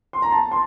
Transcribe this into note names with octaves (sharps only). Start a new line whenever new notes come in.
C6
A#5
A5
C6